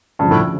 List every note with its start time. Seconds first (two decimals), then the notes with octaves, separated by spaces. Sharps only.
0.19 D2 G2 C#3 F3
0.31 A2